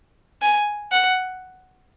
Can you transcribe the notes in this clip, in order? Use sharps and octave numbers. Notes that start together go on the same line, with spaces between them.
G#5
F#5